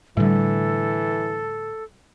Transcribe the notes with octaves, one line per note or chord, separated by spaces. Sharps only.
A2 D3 E3 G3 A4